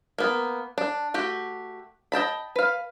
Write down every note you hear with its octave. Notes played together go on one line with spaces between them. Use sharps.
A#3 B3
D4
A3 F#4 G4
D#5 G5 A5 B5
B4 F5